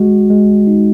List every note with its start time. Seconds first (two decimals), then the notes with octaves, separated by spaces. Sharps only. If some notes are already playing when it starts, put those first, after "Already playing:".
Already playing: G#3 F#4
0.30 G#3
0.67 D#4